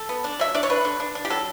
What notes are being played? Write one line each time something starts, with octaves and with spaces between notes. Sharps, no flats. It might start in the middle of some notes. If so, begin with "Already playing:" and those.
Already playing: A4
B3
D4
F#3 E5
D4 D5
C#5
D4 B4
D3
D4
D4
G4
F#3 A4